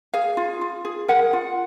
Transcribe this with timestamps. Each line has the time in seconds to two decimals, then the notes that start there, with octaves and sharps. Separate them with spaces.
0.13 G#4 F5
0.37 F4
0.61 F4
0.85 G#4
1.08 A#4 F#5
1.33 F4